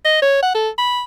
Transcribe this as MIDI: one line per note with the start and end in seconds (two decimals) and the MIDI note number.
0.05 0.19 75
0.22 0.41 73
0.43 0.51 78
0.55 0.69 69
0.78 1.03 83